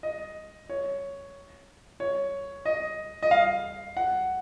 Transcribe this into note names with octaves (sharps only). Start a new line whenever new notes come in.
D#5
C#5
C#5
D#5
D#5
F5
F#5